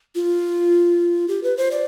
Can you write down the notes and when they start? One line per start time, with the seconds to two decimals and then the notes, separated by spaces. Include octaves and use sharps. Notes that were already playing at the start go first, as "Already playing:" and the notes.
0.15 F4
1.28 G4
1.43 B4
1.57 C5
1.71 D5